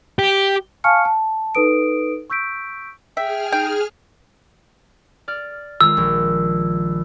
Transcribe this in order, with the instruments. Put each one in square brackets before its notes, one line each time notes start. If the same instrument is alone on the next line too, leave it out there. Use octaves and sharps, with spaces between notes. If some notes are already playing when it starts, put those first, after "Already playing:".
[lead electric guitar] G4
[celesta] F5 G#5 A5 C#6 F6 C#7
A5
D#4 A4 B4 D#6 D7
C#6 E6 G6 B6 D7
[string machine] G#4 F6 [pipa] E5 [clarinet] G5
[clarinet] D#4 [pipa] G5
[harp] D5 F6
[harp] D#3 G#3 F4 [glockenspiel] E6
[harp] A#1